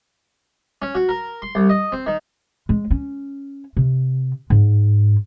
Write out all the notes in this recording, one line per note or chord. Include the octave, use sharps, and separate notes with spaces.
C#4
F#4
A#4
C6
C2
D#5
C4
D#3
G#3
C#4
C3
G#2